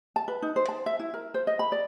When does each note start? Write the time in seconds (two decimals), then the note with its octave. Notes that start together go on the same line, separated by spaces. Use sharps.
0.16 A5
0.28 B4
0.42 D#4
0.56 C5
0.69 A5
0.86 E5
0.99 E4
1.14 A#4
1.34 C5
1.47 D#5
1.59 B5
1.72 D5